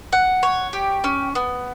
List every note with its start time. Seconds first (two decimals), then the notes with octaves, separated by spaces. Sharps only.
0.13 F#5
0.43 C#5
0.73 G4
1.04 C#4
1.35 B3